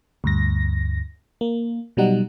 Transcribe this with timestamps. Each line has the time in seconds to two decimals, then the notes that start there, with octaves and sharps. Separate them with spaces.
0.24 D2 G2 A#6
1.41 A#3
1.97 B2 F#3 G3 D#4 F#5